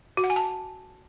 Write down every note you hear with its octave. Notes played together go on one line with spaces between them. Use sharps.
F#4
F#5
G#5
A5